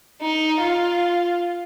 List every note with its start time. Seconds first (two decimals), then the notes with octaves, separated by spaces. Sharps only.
0.22 D#4
0.62 F4